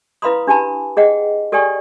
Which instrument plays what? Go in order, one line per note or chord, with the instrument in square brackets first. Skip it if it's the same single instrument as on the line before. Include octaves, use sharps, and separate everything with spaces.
[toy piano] E4 B4 F5 B5 C6 D#6
D4 G4 G#5 A5 B5
G#4 D#5 F#5 G5
G4 A4 D5 G5 G#5 C#6